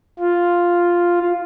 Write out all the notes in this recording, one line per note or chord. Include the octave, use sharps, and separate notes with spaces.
F4